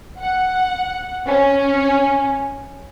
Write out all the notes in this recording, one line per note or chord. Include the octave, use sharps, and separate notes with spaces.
F#5
C#4